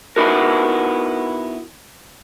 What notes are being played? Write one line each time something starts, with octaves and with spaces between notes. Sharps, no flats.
B3 D#4 E4 F#4 A#4